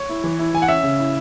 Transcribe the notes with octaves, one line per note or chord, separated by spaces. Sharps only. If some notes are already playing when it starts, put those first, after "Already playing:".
Already playing: C#5
E4
E3
E4
E3 G#5
F#5
C#4 E5
C#3
E4